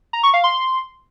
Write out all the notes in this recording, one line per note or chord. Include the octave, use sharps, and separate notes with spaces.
A#5
C#6
F5
C6